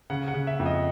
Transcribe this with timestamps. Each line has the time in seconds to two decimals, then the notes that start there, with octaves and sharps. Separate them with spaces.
0.10 C#3 F#5
0.28 F#5
0.34 C#3
0.47 E5
0.60 F2
0.66 D#5